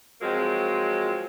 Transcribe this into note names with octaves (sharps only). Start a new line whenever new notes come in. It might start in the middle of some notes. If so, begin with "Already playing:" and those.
F3 F#3 G#3 A#3 C4